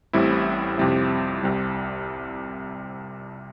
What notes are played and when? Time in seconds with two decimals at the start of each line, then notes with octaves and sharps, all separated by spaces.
0.13 A1 A2 G3 C4 E4
0.78 F2 C3 G3 C4 E4
1.43 C2 C3 G3